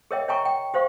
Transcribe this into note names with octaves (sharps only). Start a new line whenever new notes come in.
G#4 A#4 C#5 D#5 E5 G5
C#5 E5 G5 G#5 A#5 C#6
G5
G4 C5 F5 C#6